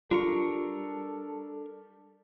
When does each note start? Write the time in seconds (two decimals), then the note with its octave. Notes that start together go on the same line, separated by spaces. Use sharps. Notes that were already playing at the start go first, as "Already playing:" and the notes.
0.11 G3 D4 F4 A4 A#4 C#6